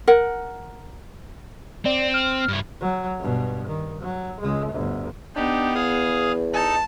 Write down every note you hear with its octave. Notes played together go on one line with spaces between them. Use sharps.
A#4 F#5
C4 D5
F6
G2 E4
F#3
G2 B2
D#3
F#3
C#2 G#3
G1 D2
B3 D4 D#4 G4
E2 G#4 F5 D#6
D#4 A4 A5